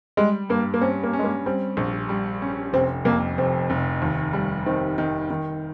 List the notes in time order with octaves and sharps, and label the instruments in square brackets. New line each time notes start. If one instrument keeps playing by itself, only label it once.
[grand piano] G3 [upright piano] G#3
[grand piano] G2 [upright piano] A#3
[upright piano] A#3
[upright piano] C4 [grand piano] C#4
[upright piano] A#3
[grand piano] C#4
[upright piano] G#3
A#3
[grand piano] G3 [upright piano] C4
[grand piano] A#1
G3
C#4
[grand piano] F1 [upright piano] C4
[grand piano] F2 [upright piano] A#3
[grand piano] F1 [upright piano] C4
[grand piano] F1
D#2
G3
[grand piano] D#3 [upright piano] C4
[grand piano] D#3
D#3